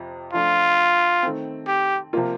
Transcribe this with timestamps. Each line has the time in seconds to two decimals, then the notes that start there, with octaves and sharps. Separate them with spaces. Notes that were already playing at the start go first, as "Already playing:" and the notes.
Already playing: F2 C3 F3
0.33 F3 A3 D4 F4
1.23 D#3 A3 C4
1.67 G4
2.13 C3 F3 A#3 F4